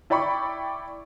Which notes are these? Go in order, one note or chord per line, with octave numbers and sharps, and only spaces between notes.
E4 D5 G5 B5 C#6